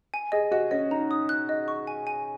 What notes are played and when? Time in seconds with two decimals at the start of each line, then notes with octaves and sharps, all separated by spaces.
0.14 G#5
0.32 G#4 D#5
0.51 F#4 D#5
0.71 C#4 D#5
0.91 D#4 A#5
1.11 D#6
1.29 F#6
1.49 D#5
1.68 C#6
1.87 G#5
2.07 G#5